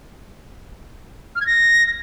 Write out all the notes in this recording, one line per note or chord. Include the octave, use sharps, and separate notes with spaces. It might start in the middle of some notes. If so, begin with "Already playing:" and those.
F6
G#6
A#6